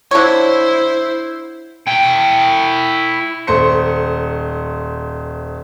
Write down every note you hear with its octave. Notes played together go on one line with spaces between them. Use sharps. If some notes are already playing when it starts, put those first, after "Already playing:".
D3 E4 C5 C#5
E4 G5
D#1 A3 C5 C#7